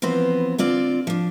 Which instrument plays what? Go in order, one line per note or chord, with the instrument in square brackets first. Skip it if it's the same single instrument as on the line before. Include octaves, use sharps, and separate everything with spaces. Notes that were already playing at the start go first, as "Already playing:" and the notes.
[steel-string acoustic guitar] E3 F3 B3 C4 C5
D3 C4 F4 D5
F3 D4